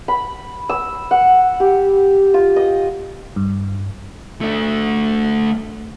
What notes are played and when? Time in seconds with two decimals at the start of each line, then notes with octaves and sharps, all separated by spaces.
0.08 B5
0.69 E6
1.11 F#5
1.60 G4
2.34 F4
2.56 D#5
3.36 G2
4.41 A3 D4